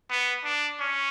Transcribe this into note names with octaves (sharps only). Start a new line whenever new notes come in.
B3
D4
C#4